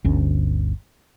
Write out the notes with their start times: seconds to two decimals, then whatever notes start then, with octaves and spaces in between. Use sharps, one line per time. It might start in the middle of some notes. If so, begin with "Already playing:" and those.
0.04 G1 D2 C#4